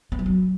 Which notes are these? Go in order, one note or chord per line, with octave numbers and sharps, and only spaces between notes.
B3
F3
F#3